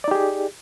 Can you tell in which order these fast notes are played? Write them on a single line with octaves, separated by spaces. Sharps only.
D5 D#4 G4 G#4